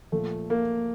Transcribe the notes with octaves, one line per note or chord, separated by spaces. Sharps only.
A#2 F3 A3
A#3